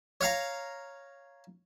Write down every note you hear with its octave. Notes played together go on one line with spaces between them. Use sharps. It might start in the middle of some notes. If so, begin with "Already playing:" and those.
C#5 F5 A#5